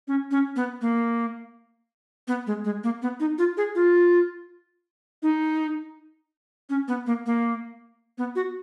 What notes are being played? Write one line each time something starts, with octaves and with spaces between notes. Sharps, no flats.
C#4
C#4
B3
A#3
B3
G#3
G#3
A#3
B3
D#4
F4
G#4
F4
D#4
C#4
B3
A#3
A#3
B3
F#4